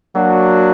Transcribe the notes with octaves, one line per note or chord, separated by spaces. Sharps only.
F#3 A#3 D4 F#4